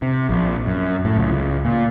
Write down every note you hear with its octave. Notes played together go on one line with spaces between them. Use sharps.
C3
A#1
F#2
A2
C#2
C#2
A#2